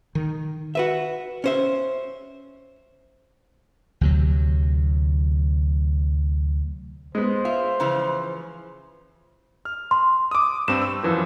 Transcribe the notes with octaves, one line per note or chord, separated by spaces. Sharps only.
D#3
F#4 B4 E5
C#4 C5 E5
D2 C3 F#3
G#3 B3 C5
F4 E5
C#3 E3 F3
F6
C6
D6 D#6
G2 C4 E7
E6
F#2 E3 F3